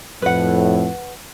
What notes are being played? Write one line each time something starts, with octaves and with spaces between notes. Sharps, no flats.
F2 A2 B4 F#5